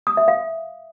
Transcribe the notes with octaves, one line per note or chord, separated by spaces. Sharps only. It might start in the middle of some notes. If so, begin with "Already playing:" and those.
D#6
E5
F5